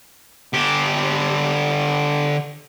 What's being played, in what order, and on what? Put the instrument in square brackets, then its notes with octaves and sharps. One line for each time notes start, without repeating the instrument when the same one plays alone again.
[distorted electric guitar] D3 G4